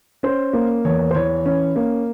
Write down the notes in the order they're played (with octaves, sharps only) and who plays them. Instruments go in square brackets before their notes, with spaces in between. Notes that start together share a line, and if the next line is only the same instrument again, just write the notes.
[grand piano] C#4 C5
A#3
E2 C#5
C5
E3 C#5
C#4
A#3